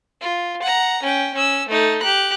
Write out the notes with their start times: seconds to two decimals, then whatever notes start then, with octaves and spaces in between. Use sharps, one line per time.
0.21 F4
0.62 F#5 A#5
1.03 C#4 G5
1.34 C#4 E6
1.69 A3 D#4
2.03 G4 F#6